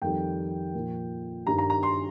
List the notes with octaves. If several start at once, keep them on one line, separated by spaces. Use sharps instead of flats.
F2 D#3 G3 G5
A#2 F3
G2 D#3 G3 A#5
A#5
A#5
C6